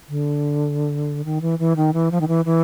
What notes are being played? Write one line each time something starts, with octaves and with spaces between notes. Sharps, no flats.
D3
D#3
E3
E3
D#3
E3
F3
D#3
E3
E3